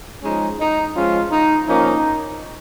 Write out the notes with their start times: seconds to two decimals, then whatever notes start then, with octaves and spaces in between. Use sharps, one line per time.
0.23 F3 G#3 C#4 D#4
0.59 D#4
0.95 F3 G#3 C#4 F4
1.31 D#4
1.68 F3 A#3 C#4 D#4